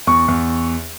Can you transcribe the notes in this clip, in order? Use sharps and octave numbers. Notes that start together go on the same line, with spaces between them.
E2 C#6
E2